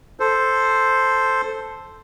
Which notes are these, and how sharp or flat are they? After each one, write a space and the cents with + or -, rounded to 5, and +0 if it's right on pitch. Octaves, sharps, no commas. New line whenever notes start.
A4 +0 C5 +0